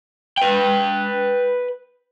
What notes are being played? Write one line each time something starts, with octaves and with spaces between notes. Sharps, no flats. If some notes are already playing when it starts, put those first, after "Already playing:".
B4 G5